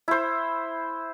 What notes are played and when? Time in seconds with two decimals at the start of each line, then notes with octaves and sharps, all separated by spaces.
0.08 E4 C5